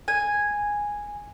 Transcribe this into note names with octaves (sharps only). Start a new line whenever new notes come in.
G#5